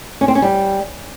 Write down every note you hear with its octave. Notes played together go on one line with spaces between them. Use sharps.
C#4
C4
C#4
G3